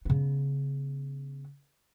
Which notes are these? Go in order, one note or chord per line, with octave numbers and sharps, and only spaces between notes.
C#3 B3